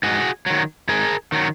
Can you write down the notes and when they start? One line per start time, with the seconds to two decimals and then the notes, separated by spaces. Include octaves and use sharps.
0.03 G#2 F#4 G#4
0.46 D#3 F#3
0.89 G#2 G#4 A#4
1.32 D#3 F#3